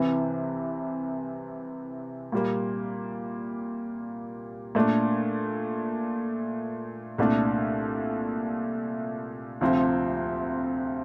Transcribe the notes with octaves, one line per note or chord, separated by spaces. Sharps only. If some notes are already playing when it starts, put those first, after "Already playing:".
Already playing: C2 C3 E3
A#2 G3 A#3
A#2 A3 D4
C2 A#2 A3 D4
D2 C3 F3 C4 F4